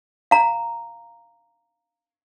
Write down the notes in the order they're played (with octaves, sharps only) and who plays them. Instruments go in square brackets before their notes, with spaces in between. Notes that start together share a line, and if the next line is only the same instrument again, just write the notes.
[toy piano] F5 A#5